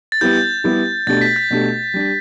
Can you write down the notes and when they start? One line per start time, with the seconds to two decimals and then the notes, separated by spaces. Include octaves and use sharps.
0.12 A6
0.21 G3 B3 E4 G4 G6
0.64 G3 B3 E4 G4
1.07 B2 A3 D4 G4 A6
1.21 B6
1.36 G6
1.51 B2 A3 D4 G4
1.94 G3 D4 G4